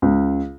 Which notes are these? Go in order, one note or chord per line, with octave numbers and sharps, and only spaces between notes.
C#2